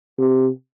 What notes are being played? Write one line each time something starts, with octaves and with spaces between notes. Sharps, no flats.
C3